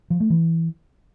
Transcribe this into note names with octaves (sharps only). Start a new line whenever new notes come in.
F3
A3
E3